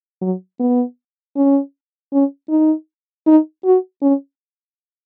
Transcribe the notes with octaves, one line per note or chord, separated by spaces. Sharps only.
F#3
B3
C#4
C#4
D#4
D#4
F#4
C#4